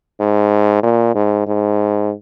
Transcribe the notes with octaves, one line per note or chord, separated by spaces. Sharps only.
G#2
A#2
G#2
G#2